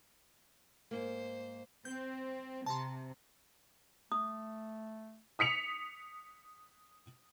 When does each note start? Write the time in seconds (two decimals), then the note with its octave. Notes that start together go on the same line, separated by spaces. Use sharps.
0.91 G#2 A#3 C5
1.85 C4 G6
2.66 C3 A5 A#5 C6
4.12 A3 D#6
5.39 D#6 B6 C#7 F7